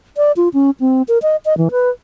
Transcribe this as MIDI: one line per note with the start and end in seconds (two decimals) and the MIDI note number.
0.17 0.32 74
0.37 0.49 65
0.54 0.71 61
0.80 1.02 60
1.08 1.18 70
1.22 1.36 75
1.45 1.57 75
1.58 1.69 52
1.71 1.90 71